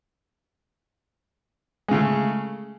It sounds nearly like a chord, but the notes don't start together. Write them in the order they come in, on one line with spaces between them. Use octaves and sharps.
G#3 C#3 A3